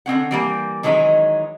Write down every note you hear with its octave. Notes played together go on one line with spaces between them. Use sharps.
D3 C4 C#4 F#5
E3 G3 A#3
D#3 E3 F#3 G#3 C#4 D#4